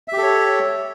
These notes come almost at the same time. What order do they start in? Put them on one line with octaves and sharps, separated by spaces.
E5 G4 A4 C#5